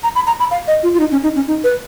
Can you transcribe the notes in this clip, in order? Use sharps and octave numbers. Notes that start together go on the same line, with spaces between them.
A#5
B5
A#5
B5
F5
D#5
F4
F4
D#4
C#4
D#4
C#4
D#4
B4